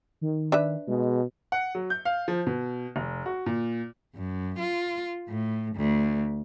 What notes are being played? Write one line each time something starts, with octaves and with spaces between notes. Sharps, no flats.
D#3
D4 B4 E5
B2 G#3
F#5
F#3
G6
F5
F3
B2
F1
F#4
A#2
F#2
F4
A2
D2